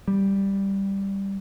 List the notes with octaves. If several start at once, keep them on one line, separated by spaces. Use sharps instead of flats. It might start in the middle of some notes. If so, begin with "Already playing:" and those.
G3